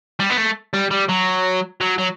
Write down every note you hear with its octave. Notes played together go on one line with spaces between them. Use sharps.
G3
B3
A3
G3
G3
F#3
F#3
F#3